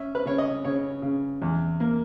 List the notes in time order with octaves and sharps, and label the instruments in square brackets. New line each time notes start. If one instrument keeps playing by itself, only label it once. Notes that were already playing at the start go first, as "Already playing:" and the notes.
Already playing: [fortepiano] C#4 E5
B4
C#3 C#5
D#5
C#3 C#5
C#3
E2
A#3